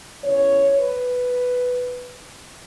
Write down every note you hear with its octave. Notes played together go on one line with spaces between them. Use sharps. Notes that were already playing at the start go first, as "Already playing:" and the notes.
E2 C#3 E3 C#5
B4